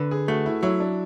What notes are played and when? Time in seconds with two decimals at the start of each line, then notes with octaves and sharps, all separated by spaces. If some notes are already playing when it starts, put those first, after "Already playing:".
Already playing: D3 B4
0.11 G#4
0.28 A3 F#4
0.46 E4
0.63 F#3 E4
0.80 D4